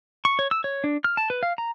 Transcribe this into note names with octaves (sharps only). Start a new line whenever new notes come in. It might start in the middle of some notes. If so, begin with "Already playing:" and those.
C#6
C#5
E6
C#5
D4
F6
A5
B4
F5
A#5